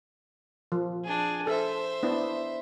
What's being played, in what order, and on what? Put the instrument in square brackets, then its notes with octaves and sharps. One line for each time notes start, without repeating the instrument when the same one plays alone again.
[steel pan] F3
[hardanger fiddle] D4 G#4
[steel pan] A4 [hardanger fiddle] C5 E5
[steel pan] B3 D4 E4